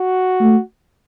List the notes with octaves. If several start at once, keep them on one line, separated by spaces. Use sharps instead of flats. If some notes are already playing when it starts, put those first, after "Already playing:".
Already playing: F#4
A3